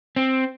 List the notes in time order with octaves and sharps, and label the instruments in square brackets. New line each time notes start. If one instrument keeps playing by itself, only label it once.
[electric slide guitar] C4